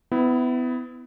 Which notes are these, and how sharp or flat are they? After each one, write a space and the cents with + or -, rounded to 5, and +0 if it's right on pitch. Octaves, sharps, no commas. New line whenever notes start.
B3 +30 E4 +0